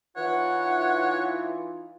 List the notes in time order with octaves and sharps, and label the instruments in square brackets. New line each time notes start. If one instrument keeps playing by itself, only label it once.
[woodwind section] E3 [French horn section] D#4 F4 [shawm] C#5 [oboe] F#5